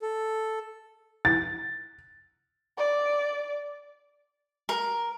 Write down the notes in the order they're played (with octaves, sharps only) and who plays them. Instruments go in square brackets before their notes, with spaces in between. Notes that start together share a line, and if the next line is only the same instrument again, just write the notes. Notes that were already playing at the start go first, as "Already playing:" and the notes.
[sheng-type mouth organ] A4
[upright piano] A6
[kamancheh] D5
[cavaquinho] A#4